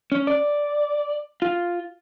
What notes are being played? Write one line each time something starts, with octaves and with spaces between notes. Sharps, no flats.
C#4
D5
F4